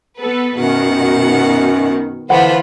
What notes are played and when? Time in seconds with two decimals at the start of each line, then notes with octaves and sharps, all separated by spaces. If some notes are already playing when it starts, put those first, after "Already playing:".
0.20 B3 A4 B4
0.58 F#2 B2 D#3 F#5
2.30 D3 E3 B3 F4 C5 F#5 B5